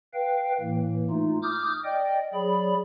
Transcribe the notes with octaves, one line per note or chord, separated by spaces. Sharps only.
B4 F5 G5
A2 E3 A#3
A3 D#4 F4
D6 D#6 F6 G6
D5 D#5 G5
F#3 G#4 D5 B5